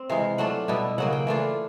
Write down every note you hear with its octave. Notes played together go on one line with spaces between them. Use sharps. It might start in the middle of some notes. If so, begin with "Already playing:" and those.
Already playing: C4
C3 E3 G#3 F5
F#3 A3 D4 F4 F#5
B2 G3 B3 E4
C#3 F#3 A#3 F#5
G5
E3 A3 D4 F4